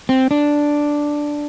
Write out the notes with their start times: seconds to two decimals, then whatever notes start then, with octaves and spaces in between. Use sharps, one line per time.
0.09 C4
0.31 D4